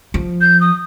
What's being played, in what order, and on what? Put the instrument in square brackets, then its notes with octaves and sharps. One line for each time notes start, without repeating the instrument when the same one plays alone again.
[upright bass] F3
[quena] G6
D#6